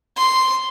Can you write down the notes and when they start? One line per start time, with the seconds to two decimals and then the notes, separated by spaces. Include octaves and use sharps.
0.17 C6